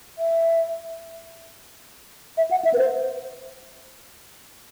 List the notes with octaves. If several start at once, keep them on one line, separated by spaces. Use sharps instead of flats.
E5
E5
F#5
E5
B4
C5